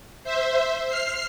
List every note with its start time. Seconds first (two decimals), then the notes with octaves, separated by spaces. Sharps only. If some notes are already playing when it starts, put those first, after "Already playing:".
0.24 C5 E5
0.87 F6 C7